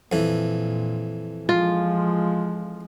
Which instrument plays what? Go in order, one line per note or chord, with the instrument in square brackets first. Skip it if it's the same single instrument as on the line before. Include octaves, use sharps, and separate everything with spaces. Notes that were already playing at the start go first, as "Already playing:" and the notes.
[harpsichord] F2 E3 [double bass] A#2
[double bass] F3 G#3 [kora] F4